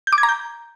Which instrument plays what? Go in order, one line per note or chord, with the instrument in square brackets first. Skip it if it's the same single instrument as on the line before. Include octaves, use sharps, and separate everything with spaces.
[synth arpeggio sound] G6
D6
G#6
A#5
G6